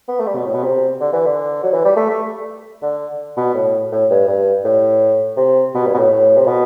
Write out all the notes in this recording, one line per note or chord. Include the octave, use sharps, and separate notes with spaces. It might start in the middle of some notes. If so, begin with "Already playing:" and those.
B3
A3
G3
B2
A2
B2
C3
D3
E3
D3
F#3
E3
G3
A3
A3
D3
B2
A2
A2
G2
G2
A2
C3
B2
G2
B2
A2
A2
C3
B2